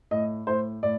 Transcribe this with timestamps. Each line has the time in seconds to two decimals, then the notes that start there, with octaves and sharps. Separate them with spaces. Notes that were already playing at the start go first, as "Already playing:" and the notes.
0.11 A2 D#5
0.47 A2 C5
0.83 A2 D5